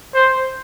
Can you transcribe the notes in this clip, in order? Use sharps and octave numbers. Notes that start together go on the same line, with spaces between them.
C5